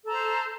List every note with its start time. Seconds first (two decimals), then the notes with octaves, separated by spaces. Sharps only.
0.04 A4
0.08 A#5
0.12 C5